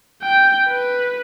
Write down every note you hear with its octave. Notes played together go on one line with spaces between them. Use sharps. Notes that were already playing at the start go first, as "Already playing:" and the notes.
G5
B4